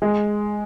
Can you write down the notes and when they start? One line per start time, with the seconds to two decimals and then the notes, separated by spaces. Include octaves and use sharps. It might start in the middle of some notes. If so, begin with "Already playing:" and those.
0.02 G#3